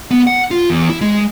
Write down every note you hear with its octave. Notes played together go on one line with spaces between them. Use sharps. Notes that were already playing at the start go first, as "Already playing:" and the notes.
B3
F#5
F4
E2
E4
G#3